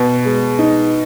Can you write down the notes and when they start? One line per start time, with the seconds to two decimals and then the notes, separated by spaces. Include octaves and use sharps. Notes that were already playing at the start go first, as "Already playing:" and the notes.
Already playing: B2
0.25 G#3
0.59 D#4